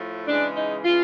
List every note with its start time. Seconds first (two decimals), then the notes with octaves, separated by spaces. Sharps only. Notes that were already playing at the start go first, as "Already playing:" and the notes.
Already playing: A2 F3 A3
0.26 C#3 E3 G#3 D4
0.56 D#4
0.84 C#3 E3 G#3 F4